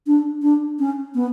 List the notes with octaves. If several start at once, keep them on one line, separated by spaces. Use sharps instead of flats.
D4
D4
C#4
B3